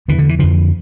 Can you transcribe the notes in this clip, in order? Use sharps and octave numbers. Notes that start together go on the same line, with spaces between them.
E2 D3 E3
D3
E3
F2 D3 F3